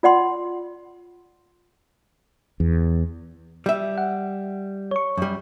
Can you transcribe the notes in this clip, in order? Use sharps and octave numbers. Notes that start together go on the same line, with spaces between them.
F4 D5 F#5 C6
E2
G3 E5
F#5
C#5 C#6
F#2 G3